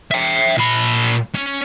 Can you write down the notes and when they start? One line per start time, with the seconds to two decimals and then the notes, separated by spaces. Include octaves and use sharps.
0.11 E5 G5
0.58 A#2 B5
1.35 C#4